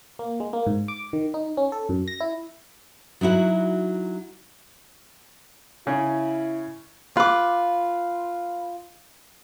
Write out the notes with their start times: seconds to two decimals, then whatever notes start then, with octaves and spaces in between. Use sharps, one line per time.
0.19 A#3
0.40 G#3
0.53 A#3
0.67 G#2
0.88 D6
1.13 D#3
1.34 D#4
1.57 C#4
1.72 A4
1.89 F#2
2.08 A#6
2.21 E4
3.21 F#3 D#4 E4 F#4
5.87 C#3 C#4 E4
7.17 F4 B4 D6